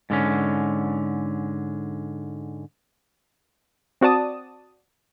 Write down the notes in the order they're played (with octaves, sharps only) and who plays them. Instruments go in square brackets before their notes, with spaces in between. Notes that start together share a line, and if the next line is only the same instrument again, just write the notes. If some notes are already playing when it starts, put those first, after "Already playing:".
[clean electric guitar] G#2 D3 C#4
[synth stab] C4 F#4 D5 A5 D#6